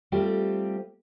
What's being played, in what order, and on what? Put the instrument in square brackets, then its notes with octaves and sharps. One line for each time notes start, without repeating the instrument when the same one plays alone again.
[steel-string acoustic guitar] G3 A3 C4 F4 G4